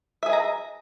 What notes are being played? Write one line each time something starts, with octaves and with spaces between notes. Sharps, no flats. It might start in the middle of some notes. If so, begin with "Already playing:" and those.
G#4 D#5 E5 A#5